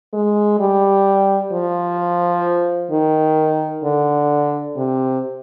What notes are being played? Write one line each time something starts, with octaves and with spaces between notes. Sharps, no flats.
G#3
G3
F3
D#3
D3
C3